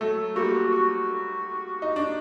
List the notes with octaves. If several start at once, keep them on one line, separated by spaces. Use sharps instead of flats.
F#3 A3 A4
G3 A#3 F#4
F#4
D#4
D4